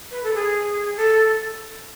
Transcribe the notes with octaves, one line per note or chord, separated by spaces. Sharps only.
B4
A4
G#4
A4